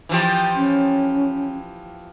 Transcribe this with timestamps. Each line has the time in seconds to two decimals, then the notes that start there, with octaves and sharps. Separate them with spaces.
0.09 E3 F3 G4
0.55 C#4